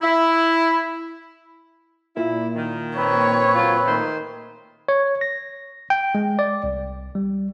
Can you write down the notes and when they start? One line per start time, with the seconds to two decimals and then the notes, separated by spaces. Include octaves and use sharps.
0.02 E4
2.17 A#2 E4
2.56 D#3
2.97 C4 B4 C#5
3.55 F#3 F4
3.86 D#3 A3 C5
4.88 C#5
5.21 A#6
5.90 G5
6.15 G#3
6.39 D5
6.64 C2
7.15 G3